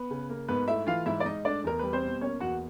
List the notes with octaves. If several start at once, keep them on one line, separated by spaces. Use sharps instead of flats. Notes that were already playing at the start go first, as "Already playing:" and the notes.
Already playing: B3 B4
C#3
A#3
G#2 B3 B4
A3 E4 E5
E3 F4 F5
G#2 E4 E5
D5
G#2 D#4 D#5
A3 D4 D5
E2 A#4
G3 B4
C4 C5
B2
A#3 C#4 C#5
E2 F#4 F#5